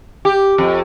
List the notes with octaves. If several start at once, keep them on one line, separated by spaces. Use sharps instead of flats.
G4
F2